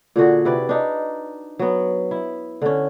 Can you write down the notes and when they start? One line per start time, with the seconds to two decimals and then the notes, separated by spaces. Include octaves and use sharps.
0.16 A#2 D3 F#4 G#4
0.45 C3 E4 B4 D5
0.69 D4 D#4
1.59 F#3 B3
2.11 E4
2.62 D3 C#4